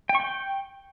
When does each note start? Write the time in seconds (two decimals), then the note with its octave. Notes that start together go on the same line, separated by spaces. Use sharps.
0.09 G5
0.15 C#6
0.20 G5